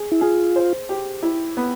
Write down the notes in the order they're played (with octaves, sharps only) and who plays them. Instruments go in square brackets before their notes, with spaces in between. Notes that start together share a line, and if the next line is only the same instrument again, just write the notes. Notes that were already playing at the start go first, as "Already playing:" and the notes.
Already playing: [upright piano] G#4
[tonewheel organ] E4
[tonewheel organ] F4 [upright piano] G#4
[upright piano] C5
G4
E4
B3